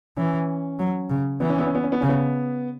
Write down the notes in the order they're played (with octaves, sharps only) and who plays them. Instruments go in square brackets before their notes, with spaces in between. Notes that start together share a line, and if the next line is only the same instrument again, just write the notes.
[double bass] E3 [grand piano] C#4
[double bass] F#3
C#3
[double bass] E3 [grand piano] B3
[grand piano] C#4
B3
C#4
B3
C#4
B3
[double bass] C#3 [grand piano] C#4
[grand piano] B3